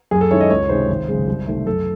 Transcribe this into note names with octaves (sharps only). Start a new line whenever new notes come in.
F#2 G#4
A4
D#3 G#3 C#4 E4 C#5
D#5
C#2 C#5
C3 D#3 G#3 C5
G#1
F#2 C#3 G#3
C2
C3 D#3 A3
F#2 A4